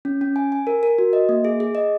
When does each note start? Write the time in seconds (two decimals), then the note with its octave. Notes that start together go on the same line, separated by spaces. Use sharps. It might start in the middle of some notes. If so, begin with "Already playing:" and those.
0.05 C#4
0.21 C#4
0.36 G#5
0.52 G#5
0.67 A#4
0.83 A#4
0.98 F#4
1.13 D#5
1.29 A#3
1.45 G#4
1.60 G#4
1.75 D#5